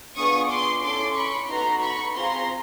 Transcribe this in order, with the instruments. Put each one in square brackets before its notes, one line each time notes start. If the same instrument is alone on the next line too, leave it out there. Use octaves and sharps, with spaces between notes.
[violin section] B3 D4 F4 G#4 C#6 D#6
C6 D6
C#4 E4 A4 C6 D6
B5 C#6
B3 D#4 F#4 A4 A#5 C6
B5 C#6
C4 F4 G#4 A#5 C6